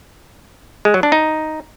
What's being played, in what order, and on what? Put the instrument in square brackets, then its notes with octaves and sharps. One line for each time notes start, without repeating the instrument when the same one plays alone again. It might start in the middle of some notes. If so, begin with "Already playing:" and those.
[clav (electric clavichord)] G#3
F#3
D4
D#4